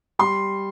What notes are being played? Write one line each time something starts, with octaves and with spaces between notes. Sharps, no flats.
G3 C6